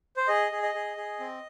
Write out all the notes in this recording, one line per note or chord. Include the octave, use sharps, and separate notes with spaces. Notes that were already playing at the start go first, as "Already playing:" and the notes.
C5
G#4 D#5
G#4
D#5
G#4
G#4
C4